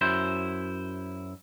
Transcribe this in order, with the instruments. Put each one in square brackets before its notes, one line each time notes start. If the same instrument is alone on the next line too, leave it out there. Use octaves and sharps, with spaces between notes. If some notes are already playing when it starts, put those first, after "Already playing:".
[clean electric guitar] F#2 E4 C5